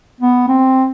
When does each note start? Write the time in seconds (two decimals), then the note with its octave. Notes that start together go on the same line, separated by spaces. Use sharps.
0.21 B3
0.48 C4